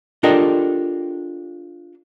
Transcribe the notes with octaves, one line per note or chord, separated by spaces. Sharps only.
D4 F4 G4 A4 A#4 D#5